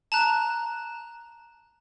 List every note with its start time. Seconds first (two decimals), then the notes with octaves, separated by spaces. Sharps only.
0.12 A5 A#5 F#6